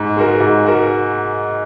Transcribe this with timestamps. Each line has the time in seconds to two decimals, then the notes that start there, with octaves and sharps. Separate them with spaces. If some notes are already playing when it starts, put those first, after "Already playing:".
Already playing: G#2
0.17 G#3 F#4 A#4
0.40 G#2
0.64 G#3 F#4 A#4